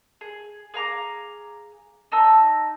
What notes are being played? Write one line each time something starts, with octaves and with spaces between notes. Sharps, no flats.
G#4
G#4 F5 A#5 D6
D#4 A5 A#5 E6